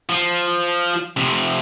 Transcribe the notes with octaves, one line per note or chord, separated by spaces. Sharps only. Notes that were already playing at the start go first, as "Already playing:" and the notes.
F3
F2 C3